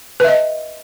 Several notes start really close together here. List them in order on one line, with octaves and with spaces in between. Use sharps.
B4 E5 D#5